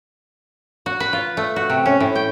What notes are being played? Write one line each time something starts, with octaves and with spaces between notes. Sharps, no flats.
F#4
B4
F4
A3
F#4
C3
C#4
A2
G5